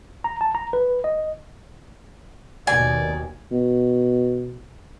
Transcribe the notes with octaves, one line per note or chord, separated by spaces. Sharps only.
A#5
A5
A#5
B4
D#5
D#2 B2 D#3 D5 G#5
B2